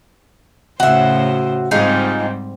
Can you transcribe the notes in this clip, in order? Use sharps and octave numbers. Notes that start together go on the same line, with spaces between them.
A2 C#3 F#4 C5 E5
G#2 G3 C4 D#4 F4 G#4